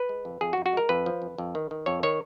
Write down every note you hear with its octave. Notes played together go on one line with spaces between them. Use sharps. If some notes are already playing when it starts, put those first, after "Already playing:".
Already playing: B4
G#3
F2
F2 G#4
F#4
F2
F#4
G#3 A#4
F2 B4
F3
F2
F2
D#3
D#3
F2 C#5
D#3 C#5